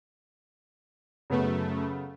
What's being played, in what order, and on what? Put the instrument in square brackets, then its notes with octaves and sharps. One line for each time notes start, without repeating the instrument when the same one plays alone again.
[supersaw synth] F#2 A3 [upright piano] C#3 B3